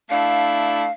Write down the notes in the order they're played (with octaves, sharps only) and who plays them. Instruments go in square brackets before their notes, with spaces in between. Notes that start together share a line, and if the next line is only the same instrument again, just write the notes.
[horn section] A3 D4 E4 [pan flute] F5